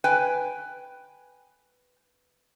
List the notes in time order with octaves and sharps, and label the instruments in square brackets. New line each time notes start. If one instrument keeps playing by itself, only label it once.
[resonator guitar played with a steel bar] B4 G5 G#5